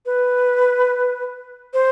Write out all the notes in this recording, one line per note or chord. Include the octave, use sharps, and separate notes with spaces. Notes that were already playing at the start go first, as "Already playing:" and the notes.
B4
C5